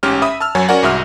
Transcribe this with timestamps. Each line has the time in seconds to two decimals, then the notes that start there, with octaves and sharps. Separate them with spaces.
0.03 A1 G#2 C#4 G4 F6
0.22 E5 B5 D#6
0.40 A5 E6 F6
0.55 F#2 F#3 C#5 G#5
0.68 C#4 F#4 A#4 D5 F#5 G#5
0.83 C2 G#2 F#4 E5 D#6 F6